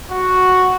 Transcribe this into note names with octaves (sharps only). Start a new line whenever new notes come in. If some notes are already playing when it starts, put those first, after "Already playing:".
F#4